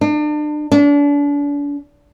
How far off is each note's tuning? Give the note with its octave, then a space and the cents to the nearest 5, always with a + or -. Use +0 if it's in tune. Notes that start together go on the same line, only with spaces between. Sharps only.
D4 +35
D4 -35